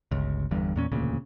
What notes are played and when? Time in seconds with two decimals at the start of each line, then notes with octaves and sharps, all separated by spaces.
0.11 G1 C#2
0.51 G1 E2 G2
0.76 E2 A#2 C#4
0.92 E1 D2 A#2 C#3